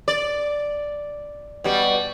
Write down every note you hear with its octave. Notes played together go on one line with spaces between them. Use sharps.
D5
B2 G3